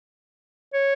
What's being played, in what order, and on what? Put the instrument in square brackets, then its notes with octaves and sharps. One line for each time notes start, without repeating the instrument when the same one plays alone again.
[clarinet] C#5